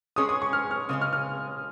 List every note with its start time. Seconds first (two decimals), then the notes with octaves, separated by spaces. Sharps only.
0.16 G#3 C#4 G#4 C#5 D#6
0.29 D#6
0.42 C#6
0.53 F6
0.71 F6
0.89 C#3 G#3 C#4 D#6
1.01 F6
1.13 F6